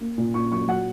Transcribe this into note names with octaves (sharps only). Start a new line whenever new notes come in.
A#3
A#2
A#2 C#6
F#3 C#6
F#3 F#5